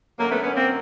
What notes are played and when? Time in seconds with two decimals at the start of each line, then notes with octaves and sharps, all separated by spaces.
0.19 F#2 D3 F#3 A3 A#3
0.31 A3 B3
0.42 B3 C#4
0.55 A#3 C4